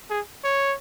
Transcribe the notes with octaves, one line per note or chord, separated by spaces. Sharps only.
G#4
C#5